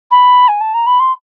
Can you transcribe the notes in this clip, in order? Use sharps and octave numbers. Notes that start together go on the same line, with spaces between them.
B5
G#5
A5
A#5
B5
C6